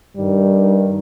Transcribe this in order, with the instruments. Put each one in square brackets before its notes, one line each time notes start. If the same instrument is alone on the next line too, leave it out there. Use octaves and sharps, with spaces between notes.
[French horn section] G2 D#3 G3